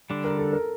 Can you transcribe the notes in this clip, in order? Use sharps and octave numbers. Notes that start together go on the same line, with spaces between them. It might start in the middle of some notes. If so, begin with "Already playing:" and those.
D3 G3 D4
A#4
A4
A#4